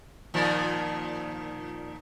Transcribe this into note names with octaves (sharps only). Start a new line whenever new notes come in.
A#2 D#3 F3